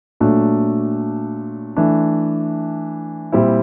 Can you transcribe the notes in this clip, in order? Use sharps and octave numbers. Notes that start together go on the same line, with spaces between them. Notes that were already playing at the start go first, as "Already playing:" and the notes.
A#2 F#3 A3 D4
E3 A3 D4
A#2 G3 C4 E4